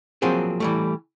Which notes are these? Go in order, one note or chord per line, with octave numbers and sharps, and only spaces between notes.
F3 F#3 A#3 C4 G#4
E3 G3 A3